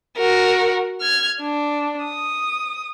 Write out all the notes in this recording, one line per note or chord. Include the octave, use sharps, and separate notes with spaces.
F#4 A#4
F6 G#6
D4
D#6